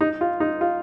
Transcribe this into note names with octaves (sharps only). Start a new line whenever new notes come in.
D#4
F4
D#4
F4